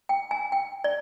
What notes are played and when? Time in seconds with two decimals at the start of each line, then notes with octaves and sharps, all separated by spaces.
0.09 G5
0.31 G#5
0.52 G5
0.84 D5